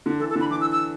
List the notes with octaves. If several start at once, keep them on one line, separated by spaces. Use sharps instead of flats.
D3
E3 A4
A4
D3
B5
E3 D6
E6
E6